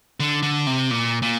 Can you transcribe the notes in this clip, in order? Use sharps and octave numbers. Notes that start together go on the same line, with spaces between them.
D3
D3
C3
A#2
A#2